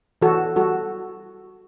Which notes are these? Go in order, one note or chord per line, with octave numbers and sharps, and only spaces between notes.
E3 F#4 A4
G3 F#4 A4